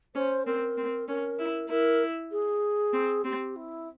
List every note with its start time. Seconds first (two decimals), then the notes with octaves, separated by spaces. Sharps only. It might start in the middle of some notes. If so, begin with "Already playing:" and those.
0.15 C#4 C5
0.46 C4 A#4
0.77 C4
1.08 C#4 A#4
1.39 E4
1.69 E4 A#4
2.32 G#4
2.93 C4
3.24 C4 G4
3.56 E4